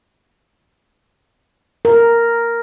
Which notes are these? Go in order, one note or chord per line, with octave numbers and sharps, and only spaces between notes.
A#4